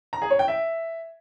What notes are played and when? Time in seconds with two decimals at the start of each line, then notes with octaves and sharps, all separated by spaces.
0.13 A#5
0.22 G#4
0.30 C#5
0.39 G5
0.48 E5